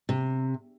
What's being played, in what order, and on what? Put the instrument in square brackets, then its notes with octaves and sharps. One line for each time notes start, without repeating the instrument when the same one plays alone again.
[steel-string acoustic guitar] C3